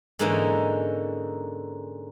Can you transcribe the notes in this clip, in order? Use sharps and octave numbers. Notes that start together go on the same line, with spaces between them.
G#2 D3 E3 A#3 C#4 D#4